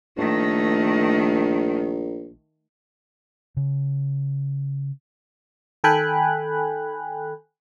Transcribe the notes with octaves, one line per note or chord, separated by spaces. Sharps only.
A#1 D#3 A3
C#3
D#3 A4 G5 G#5 B5 F#6